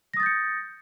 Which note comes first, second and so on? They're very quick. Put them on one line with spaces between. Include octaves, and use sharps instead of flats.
A#6 D#6 A6 G6 C#7